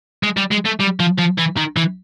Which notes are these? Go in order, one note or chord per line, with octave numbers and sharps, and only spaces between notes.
G#3
G3
G#3
A3
G3
F3
F3
E3
D#3
E3